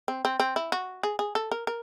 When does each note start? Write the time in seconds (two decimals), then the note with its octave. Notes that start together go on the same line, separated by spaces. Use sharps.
0.08 C4
0.25 C4
0.40 C4
0.56 E4
0.72 F#4
1.03 G#4
1.19 G#4
1.35 A4
1.51 A#4
1.67 A#4